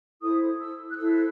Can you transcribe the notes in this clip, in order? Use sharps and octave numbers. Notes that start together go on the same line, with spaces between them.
E4 A4 C5 D#6
E6
F#6
E4 A4 C5 E6